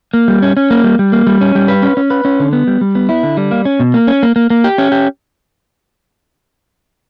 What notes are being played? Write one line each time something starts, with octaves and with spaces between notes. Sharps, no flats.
A#3
G3
C#4
C#4
A#3
G3
G3
A#3
G3
C#4
G3
B4
C#4
C#4
B4
C#4
D3
B3
G3
G3
B3
E4
D3
G3
A#3
C#4
B2
A#3
C#4
A#3
A#3
A#3
G4
C#4
G4